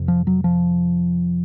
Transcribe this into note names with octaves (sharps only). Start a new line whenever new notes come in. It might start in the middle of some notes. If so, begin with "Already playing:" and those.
Already playing: F2 C3
F3
F#3
F3